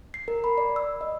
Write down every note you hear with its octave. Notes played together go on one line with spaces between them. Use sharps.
C7
A#4
B5
D5
E6
D#5